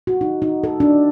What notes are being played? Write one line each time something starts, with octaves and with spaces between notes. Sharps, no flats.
F#4
D#4
D#4
A4
D4